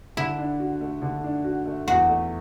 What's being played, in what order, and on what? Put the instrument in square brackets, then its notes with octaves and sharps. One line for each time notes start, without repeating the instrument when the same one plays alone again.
[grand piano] D3 [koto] E4
[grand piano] D4
F#4
A3
D3
D4
F#4
A3
[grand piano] E2 [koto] F#4
[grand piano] A3